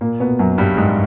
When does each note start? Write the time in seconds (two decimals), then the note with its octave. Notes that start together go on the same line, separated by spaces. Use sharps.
0.01 A#2 A#3
0.20 B2 B3
0.39 F#2 F#3
0.58 G2 G3
0.77 G#2 G#3